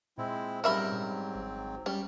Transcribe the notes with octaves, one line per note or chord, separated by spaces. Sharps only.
A#2 G#3 C4 E4
G#2 F#3 G3 C4 C#4 A#4 E5 B5
G#1
G3 C#4